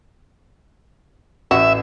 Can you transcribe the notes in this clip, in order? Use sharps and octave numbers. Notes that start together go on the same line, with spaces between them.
A1 F#4 E5